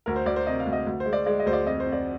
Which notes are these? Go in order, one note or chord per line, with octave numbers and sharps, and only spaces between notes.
D2 A#4
C5
D2 D5
C5
C3 D#5
F5
D2
D#5
D2
C5
G#3
D5
G#3 D5
D#5
D2 C5
D5
F2 D#5
C5
F2
D5